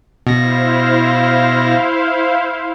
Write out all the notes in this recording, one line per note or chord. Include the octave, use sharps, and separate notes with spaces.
B2 E4 C5 F5 A#6